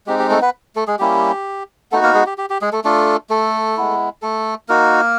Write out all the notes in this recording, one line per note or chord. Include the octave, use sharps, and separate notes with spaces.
G#3 C4 D#4 G4
G4
A3 A4
B3 B4
A3 A4
G#3 G#4
G3 A#3 C#4 E4 G4
A3 B3 D#4 F#4 A4
A#3 A#4
G#3 G#4
G4
G4
G4
G#3 G#4
A3 A4
A3 D4 F4 A4
A3 A4
G#3 B3 E4
A3 A4
A#3 D#4 F#4 A#4